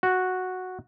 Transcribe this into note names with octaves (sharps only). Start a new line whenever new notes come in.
F#4